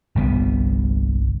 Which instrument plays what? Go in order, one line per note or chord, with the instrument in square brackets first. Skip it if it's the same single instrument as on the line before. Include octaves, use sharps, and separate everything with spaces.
[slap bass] G1 C2 G3 B3